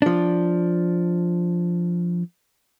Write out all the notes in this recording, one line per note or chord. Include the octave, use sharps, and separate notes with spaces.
F3 D4